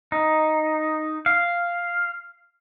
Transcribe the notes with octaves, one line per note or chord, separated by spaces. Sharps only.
D#4
F5